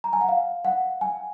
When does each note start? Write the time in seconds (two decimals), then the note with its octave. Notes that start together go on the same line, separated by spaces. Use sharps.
0.04 A#5
0.13 G#5
0.21 F#5
0.29 F5
0.65 F#5
1.01 G#5